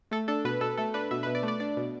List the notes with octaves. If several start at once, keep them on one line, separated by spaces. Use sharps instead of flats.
A3 A4
D4 A4
B2 B4
B2 A4
A3 A4
D4 B4
B2 E5
B4
B2
D5
A3
D5
D4 D5
B2